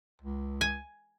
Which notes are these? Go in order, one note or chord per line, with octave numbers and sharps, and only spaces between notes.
C#2
G#5